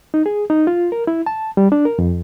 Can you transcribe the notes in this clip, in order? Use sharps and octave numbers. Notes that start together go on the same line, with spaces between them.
D#4
G#4
D#4
F4
A#4
E4
A5
G3
D4
A#4
F2